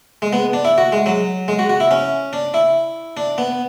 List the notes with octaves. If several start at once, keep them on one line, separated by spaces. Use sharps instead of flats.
G#3
B3
D4
E4
F#4
G#3
F#3
G#3
F#4
F#4
E4
C#4
D4
E4
D4
B3